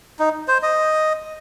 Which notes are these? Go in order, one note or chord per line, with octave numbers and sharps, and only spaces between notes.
D#4
C5
D#5